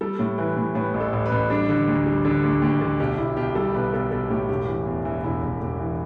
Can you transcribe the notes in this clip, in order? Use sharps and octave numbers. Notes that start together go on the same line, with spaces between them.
G3 A4
A2
E3 B4
A2
A2 B4
A1
A4
A1
B4
A1
G3 D4
D3
D2
G3
D3 D4
D2
D2 G4
D3
B1 G4
B1 E4
B1 G4
G3 A4
B1 B4
B1 A4
B1 A4
A2 G4
E1 G4
E3
E2
E3
E1 E4
E1
E1 G4
E3